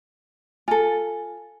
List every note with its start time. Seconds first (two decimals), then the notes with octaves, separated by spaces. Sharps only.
0.68 F4 A4 G#5